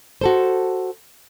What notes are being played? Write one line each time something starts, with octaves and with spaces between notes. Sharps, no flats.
F#4 A4 C5